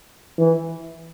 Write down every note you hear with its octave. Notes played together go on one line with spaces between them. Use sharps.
E3